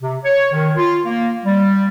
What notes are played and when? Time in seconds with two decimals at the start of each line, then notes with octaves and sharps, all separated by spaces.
0.01 C3
0.24 C#5
0.53 D#3
0.77 F4
1.06 A#3
1.45 G3